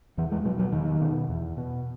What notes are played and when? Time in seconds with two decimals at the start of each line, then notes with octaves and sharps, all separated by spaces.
0.17 E2 E3
0.32 G#3
0.45 B2 F#3
0.59 F#3
0.73 E2 D#3
1.01 B2
1.29 E2
1.57 B2